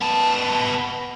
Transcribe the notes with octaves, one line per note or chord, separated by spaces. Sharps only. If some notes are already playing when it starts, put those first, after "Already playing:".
B3 A5